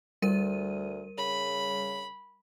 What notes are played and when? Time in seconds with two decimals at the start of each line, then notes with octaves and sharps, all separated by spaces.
0.22 D2 G3 A#4 D#7
1.18 C#3 B5